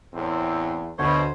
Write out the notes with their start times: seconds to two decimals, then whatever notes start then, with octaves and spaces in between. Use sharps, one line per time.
0.14 E2 A2 C4
0.99 D2 B2 C5 C#5 B5